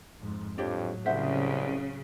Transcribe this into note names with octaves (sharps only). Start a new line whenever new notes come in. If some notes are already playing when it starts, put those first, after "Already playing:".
F2 G#2
F2 A2 F#3 D4 G4 C#5
C2 C#3 C5 E5 F#5